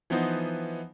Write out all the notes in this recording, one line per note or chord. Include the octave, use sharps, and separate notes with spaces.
E3 F3 B3 D#4 C5